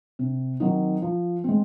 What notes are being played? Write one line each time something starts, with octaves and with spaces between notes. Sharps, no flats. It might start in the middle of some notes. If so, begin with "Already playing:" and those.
C3
D#3 F#3 C4 D#4
F3
G#3 C4